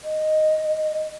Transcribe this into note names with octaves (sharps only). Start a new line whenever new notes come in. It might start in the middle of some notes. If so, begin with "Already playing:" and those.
D#5